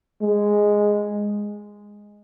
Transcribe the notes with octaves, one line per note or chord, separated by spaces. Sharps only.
G#3